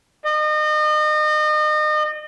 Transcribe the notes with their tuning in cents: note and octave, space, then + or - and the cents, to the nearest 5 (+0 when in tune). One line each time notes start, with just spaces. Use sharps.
D#5 -35